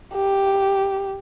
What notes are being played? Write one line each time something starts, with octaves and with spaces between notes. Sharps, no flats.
G4